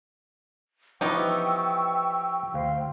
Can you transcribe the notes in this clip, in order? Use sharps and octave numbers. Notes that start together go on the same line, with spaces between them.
E3 F3 B3 D#4 G4 G5 C#6 E6
D2 C5 F5